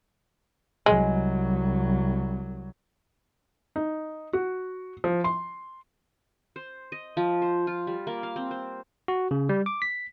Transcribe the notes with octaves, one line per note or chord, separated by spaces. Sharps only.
C2 F#3 G#3
D#4
F#4
F3
C6
C5
D#5
F3
C5
F4
G3
A#3
F5
C4
C5
F#4
C#3
G3
D6
B6